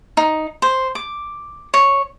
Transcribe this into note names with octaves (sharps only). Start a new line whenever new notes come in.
D#4
C5
D6
C#5